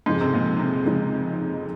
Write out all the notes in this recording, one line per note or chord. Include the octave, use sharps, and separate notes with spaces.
F2 G#2 C#3 G#3 D#4
C3
A#2
C3
F2 C#3 G#3 D#4